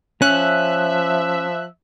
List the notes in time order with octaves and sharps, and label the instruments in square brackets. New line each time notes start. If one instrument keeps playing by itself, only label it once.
[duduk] F3 [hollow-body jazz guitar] C#4 [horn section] E5 [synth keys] F#6